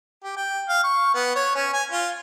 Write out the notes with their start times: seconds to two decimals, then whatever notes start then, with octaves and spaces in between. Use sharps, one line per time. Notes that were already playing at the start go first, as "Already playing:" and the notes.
0.23 G4
0.36 G5
0.69 F5
0.83 C#6
1.14 B3
1.36 C#5
1.55 C#4
1.73 G#5
1.91 F4